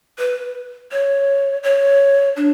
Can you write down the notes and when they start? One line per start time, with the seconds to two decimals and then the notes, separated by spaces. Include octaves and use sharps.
0.18 B4
0.92 C#5
1.63 C#5
2.36 D4